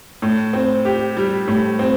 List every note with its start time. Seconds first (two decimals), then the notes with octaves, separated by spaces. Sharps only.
0.22 A2
0.53 C4
0.85 G4
1.17 G3
1.48 A2
1.79 C4